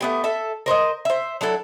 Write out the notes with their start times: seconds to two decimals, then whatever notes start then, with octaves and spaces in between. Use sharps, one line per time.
0.01 A3 B3 G4
0.24 A4 E5
0.66 A#4 C5 C#5 D#5
1.05 C5 E5
1.41 F#3 D4 E4 A4